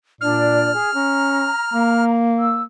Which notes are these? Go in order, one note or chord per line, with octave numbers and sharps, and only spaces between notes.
A#2 D4 D5 F6
G#4
C#4 A#5
A#3
E6